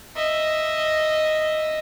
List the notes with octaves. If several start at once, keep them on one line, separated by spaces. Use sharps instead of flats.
D#5 E5